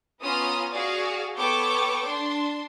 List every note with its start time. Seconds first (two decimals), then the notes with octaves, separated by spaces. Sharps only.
0.21 B3 C#4 F4 A#5 D#6 F6
0.71 F#4 G#4 D5 F5
1.36 B3 A4 C#5 G5 C#6 D6
2.06 D4 C6